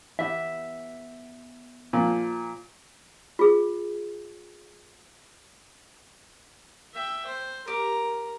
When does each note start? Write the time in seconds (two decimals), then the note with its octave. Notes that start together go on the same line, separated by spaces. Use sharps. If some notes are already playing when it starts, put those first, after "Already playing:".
0.19 E3 B3 G4 E5
1.93 A#2 F3
3.39 F4 G#4
6.93 E5 G5
7.27 C5
7.67 G4 A#4 A#5